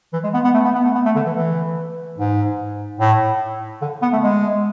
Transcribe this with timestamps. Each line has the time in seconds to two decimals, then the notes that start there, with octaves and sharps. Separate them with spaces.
0.13 E3
0.24 G#3
0.34 B3
0.44 B3
0.54 A3
0.65 B3
0.75 B3
0.85 A3
0.95 B3
1.06 A3
1.16 D3
1.26 E3
1.36 E3
2.18 G#2
3.00 A2
3.81 D3
4.02 B3
4.13 A3
4.23 G#3